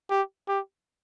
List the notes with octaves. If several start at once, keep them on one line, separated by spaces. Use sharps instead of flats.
G4
G4